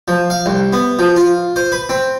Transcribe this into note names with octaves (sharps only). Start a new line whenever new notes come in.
F3
F5
C2
B3
F3
F4
C5
B4
C4